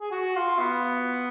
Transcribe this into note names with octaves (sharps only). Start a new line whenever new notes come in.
G#4
F#4
F4
B3